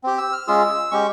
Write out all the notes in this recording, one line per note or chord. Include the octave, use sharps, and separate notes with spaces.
C4 G4
E6
F6
G#3 C#4 F4 G#4 E6
G#3 C#4 G4 C#6